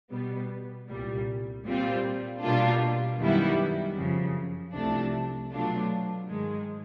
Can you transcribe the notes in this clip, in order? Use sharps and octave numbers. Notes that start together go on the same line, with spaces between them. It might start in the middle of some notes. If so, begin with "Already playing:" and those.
B2 G3 B3
C2 A#2 G3
A#2 G3 C4 F4
B2 G3 A#3 D4 F4
F#2 D#3 G3 B3 E4
F#2 C#3 F3
C2 C3 F3 A3 D4
B2 F#3 A3 D4 F4
G#2 D#3 G#3